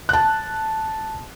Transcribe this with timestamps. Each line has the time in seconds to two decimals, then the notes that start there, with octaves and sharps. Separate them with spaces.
0.09 A5 F#6